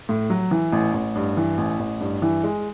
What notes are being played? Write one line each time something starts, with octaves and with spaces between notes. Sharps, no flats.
A2
F#3
E3
A1
A1
G2
E3
A1
A1
G2
E3
G#3